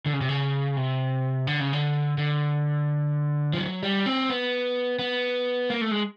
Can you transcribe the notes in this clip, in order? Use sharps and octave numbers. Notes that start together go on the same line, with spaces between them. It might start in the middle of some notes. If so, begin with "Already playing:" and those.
D3
C#3
C3
C#3
C3
D3
C#3
D3
D3
F3
F#3
G3
C4
B3
B3
A#3
A3
G#3